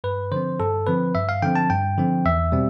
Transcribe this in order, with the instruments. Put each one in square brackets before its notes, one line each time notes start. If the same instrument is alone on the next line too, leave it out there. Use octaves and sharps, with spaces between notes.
[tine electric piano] G2 B4
D3 F3 C4 C5
G2 A4
D3 F3 C4 B4
G2 E5
F5
D3 F3 C4 G5
A5
G2 G5
D3 F3 C4
E2 E5
B2 G3 C4